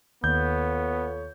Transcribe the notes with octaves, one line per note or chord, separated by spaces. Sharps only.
D#2 B3 F4 A4 C#5 G6